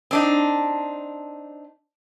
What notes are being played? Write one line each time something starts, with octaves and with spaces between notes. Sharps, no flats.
C4 D4 D#4